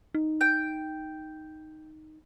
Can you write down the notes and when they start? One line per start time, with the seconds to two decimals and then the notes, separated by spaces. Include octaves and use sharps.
0.15 D#4
0.41 G5